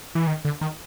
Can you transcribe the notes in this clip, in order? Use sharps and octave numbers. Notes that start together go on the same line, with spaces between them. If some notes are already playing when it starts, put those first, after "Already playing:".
E3
D#3
D3
D#3